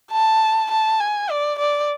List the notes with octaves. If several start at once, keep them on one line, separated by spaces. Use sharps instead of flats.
A5
A5
G#5
D5
D5